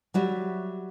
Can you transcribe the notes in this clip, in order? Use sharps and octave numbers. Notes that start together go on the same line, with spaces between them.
F#3 G3 F#4 E5